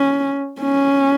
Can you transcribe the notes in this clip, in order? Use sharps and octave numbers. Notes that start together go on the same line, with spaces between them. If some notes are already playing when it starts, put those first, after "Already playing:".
Already playing: C#4
C#4